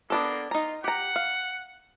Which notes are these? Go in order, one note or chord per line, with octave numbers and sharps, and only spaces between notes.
A#3 B3 D4 A4
D#4 F4 A#5
G4 F#5 A#5
F5